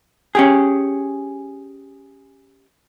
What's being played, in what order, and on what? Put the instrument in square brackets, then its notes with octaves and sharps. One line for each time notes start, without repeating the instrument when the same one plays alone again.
[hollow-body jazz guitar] C#4 G4 G#4